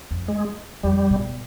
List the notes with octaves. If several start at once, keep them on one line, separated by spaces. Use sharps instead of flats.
F2
G#3
F2 G3
B2